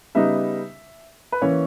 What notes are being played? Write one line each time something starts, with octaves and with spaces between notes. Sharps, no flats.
C#3 G3 B3 D#4 E5
B4
E3 A#3 C#4 C#5